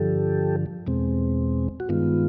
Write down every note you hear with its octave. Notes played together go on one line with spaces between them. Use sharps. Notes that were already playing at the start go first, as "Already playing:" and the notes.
Already playing: G2 D3 F3 G4 A4
E2 B2 G#3 C4
F#4
G2 D#3 G#3 B3 F4